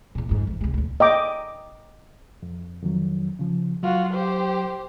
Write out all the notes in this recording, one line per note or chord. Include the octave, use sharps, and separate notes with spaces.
E2 A#2
F2 G#2
D3 E3
C2 G#3
D#1 D2
D#5 G5 D6
F2
F2 D#3 F#3
C#3 F3
F#3 F4 F#4
G4 C5